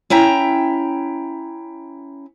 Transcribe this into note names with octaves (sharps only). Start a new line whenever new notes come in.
C#4 E4 G5 A#5